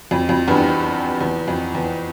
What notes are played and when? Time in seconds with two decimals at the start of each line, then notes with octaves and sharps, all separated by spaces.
0.11 F2
0.29 F2
0.48 E2 G2
1.21 E2
1.48 F2
1.75 E2